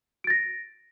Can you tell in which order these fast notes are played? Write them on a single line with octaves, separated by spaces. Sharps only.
D7 A6 A#6